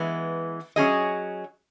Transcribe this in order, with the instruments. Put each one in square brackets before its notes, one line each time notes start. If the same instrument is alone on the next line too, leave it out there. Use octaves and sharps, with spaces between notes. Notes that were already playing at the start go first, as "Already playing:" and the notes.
Already playing: [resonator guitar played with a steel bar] E3 G#3 B3
F#3 C#4 G#4 D#5